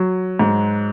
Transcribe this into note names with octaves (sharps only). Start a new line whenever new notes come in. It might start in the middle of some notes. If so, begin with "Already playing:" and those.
Already playing: F#3
G#2